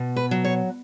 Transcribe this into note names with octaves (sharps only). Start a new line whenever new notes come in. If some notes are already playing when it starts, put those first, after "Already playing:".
Already playing: B2
B4
F#3
C#5